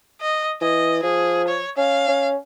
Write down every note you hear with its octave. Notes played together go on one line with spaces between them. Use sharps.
D#5
E3 D#5
F3 G#4
C#5
C#4 F5
C#4